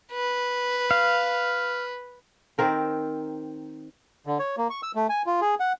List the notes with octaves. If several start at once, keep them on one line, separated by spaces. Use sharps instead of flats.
B4
F5
D#3 C4 A#4 C5
D3
C#5
A#3
C#6
E6
A3
G#5
F4
G#4
F#5